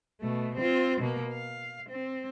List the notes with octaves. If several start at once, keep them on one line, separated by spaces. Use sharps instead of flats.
B2 A3
C4 F4
B2 A#3
F5
C4